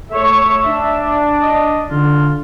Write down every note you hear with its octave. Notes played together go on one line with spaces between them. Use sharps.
A3 C#5 E5
D4
D#5
D3 F4